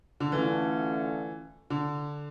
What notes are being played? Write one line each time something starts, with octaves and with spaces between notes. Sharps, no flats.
D3
D3 E3 A3 C#4 F4
D3